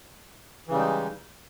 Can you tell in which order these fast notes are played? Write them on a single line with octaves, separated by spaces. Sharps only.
E3 C#3 G3 G#3 D#4